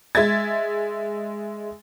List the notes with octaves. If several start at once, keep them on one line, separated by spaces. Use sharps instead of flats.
G#3 E5 G#6 A6